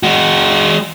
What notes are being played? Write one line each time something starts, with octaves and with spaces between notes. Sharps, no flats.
G#3 F#4